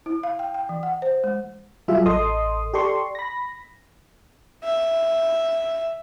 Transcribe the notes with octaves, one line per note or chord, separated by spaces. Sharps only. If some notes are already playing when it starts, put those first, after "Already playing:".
E4
F5
G5
G5
E3
F#5
C5
G#3
F#3 G3 F4 G#4 E5
A1 A4 D#5 C6 D#6
G4 A4 D5 C6 C#6
B5 A#6
E5